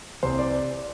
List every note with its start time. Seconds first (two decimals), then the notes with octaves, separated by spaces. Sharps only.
0.23 C2 C5
0.39 D5